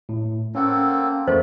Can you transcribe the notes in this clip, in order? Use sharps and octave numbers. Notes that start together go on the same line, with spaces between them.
A2
A#3 C4 C#4 A4 F#5
F2 A3 A#3 C5